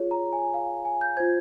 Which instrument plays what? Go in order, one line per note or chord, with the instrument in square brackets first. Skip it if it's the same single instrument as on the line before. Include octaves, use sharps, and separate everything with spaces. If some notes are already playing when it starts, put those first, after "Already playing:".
Already playing: [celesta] F4 G#4 C#5
A#5
G#5
F5
G#5
G6
F4 C5 G#6